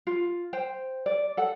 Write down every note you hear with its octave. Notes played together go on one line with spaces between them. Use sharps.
F4
C5 G5
D5
A4 F#5